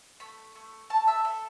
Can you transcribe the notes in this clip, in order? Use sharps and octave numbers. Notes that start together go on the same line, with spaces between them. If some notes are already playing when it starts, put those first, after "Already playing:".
A3 B5
A3
A3 A5
E5
A4 E5